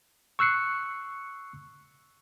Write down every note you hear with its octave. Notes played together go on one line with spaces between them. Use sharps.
C#6 E6 F#6 C7 C#7